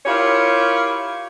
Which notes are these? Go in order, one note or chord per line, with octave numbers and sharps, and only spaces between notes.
E4 F4 G4 A#4 C#5